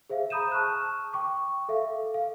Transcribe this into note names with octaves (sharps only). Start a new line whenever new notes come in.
G#4 C5 E5 F5
A#5 B5 D#6 G6 D#7 E7
A5 C#6 F6 F#6
G5 C#6 D6
A4 E5 F5
F5